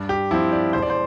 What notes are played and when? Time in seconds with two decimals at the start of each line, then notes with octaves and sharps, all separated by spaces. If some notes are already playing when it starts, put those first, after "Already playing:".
Already playing: G2
0.09 G4
0.31 F3 C4 E4
0.52 D5
0.73 E1 C5
0.82 D5
0.90 C5